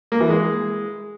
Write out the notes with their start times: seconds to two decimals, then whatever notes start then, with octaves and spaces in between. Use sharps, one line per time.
0.12 A#3
0.20 E3
0.29 G#3